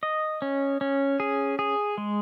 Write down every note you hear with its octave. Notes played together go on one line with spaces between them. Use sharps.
D#5
C#4
C#4
G#4
G#4
G#3